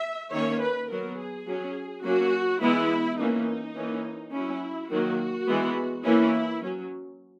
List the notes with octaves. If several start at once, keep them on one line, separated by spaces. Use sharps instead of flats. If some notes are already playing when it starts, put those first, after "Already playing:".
Already playing: E5
D#3 A#3 C#4 C#5
B4
F#3 B3 A#4
G#4
F#3 C#4
F#3 A#3 C#4 F#4
E3 G#3 B3 E4
E3 A#3 C#4 D#4
E3 A#3 C#4
F#3 C#4 E4
D#3 F#3 A#3 F#4
E3 G#3 B3
E3 A#3 C#4 E4
F#3 C#4